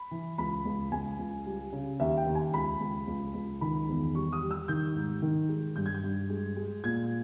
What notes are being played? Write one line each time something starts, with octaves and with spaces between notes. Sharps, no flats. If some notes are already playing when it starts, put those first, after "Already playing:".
Already playing: B5
E3
C#2 B5
C#2
C#2 G#5
C#2
G3
C#3
D#2 E5
G5
D#2
G#5
C#2 B5
C#2
C#2
C#2
D#3 B5
E2
G3 C#6
D#6
G3
E6
D#3 G6
G#2
D#3
G#3
G2 G6
G#6
G6
G2
G#3
G#3
A#2 G#6